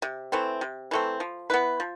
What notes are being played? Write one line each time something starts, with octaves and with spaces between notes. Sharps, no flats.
C3
E3 A3 C4
C3
E3 A3 C4
F3
B3 E4 B4
F3